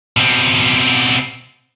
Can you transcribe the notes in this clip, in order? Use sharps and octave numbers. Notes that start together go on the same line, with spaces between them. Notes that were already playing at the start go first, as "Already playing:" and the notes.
B2 C4